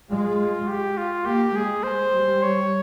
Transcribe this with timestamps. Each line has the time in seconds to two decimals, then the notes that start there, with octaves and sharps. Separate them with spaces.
0.11 G#3 F4
0.69 G4
0.98 F4
1.26 A#3 G4
1.55 G#3 G#4
1.84 C5
2.13 G3
2.43 C#5